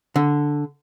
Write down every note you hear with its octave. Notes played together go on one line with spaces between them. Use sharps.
D3